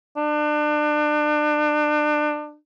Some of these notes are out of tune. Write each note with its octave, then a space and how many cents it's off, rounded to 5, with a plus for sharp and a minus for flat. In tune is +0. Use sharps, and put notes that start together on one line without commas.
D4 +30